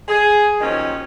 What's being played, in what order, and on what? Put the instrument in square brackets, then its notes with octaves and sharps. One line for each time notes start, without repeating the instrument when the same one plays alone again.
[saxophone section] G#4
D#2 A#2 D#3 F3 F#3 C#4